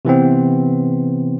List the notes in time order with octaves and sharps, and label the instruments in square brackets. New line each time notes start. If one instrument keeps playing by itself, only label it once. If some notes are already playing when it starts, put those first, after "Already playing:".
[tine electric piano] C3 E3 B3 C4